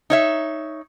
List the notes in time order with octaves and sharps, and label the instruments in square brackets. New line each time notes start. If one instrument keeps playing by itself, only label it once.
[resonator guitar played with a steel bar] D#4 C#5 E5